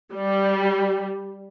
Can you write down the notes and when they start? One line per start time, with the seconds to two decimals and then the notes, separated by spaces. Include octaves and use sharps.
0.12 G3